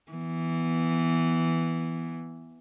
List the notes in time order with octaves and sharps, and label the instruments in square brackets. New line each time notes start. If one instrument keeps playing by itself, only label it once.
[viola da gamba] E3 B3